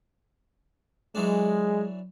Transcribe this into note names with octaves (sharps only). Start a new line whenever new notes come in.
E3 F#3 G#3 D4